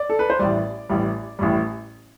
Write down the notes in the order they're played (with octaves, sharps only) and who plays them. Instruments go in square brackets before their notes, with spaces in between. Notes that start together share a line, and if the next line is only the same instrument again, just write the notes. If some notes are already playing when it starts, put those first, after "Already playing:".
Already playing: [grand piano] D5
A4
B4
C5
A1 A2 G3 D5
A1 A2 G3
A1 A2 G3